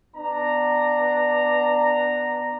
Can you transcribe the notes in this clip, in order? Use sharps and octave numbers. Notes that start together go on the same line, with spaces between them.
B3 D4 A#5